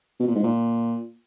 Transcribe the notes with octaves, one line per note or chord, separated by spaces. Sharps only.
B2
A#2
G#2
A#2